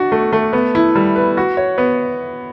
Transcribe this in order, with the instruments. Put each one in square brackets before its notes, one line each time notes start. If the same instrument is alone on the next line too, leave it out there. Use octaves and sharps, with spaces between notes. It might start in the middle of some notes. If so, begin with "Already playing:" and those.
Already playing: [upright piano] D4 F#4
A3
A3
B3
E4
G3
B4
F#4
C#5
B3